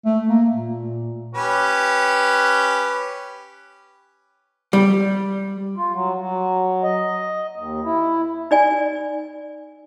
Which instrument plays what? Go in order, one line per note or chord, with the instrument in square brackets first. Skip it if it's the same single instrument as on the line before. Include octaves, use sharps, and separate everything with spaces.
[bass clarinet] A3
A#3
A#2
[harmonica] C#4 G4 B4
[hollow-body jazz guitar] G3
[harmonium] F4
F#3
F#3
D#5
D#2
E4
[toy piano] D#4 D5 G#5